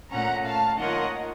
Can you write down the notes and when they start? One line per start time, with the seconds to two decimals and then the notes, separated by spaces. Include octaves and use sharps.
0.12 A#2 A3 C#4 F#5 A#5
0.46 F5 A5
0.78 D#3 A#3 F4 A#4 C#5 D#5 F#5